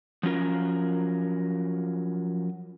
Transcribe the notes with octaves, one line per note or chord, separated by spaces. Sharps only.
F3 F#3 C#4 F4 A#4